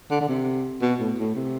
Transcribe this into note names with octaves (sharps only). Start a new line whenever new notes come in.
D3
D3
C3
B2
A2
A2
C3